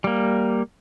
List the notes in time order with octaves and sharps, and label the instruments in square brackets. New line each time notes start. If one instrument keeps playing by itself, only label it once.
[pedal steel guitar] G3 A#3